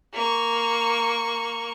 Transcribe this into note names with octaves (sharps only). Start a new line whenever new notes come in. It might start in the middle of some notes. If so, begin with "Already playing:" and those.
A#3 C#6